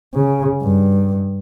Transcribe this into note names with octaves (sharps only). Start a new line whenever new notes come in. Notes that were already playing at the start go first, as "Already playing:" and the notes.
C#3
G2